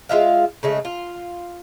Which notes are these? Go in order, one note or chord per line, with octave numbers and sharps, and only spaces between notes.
G#3 F4 E5 F5
C#3 G#3 A3
F4